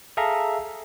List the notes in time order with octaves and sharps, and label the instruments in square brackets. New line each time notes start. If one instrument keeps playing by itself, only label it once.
[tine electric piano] G#4 A4 E5 F5 A#5